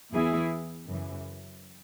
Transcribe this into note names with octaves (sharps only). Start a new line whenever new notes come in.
E2 E3 B3 E4 G#4
F#2 C#3 E3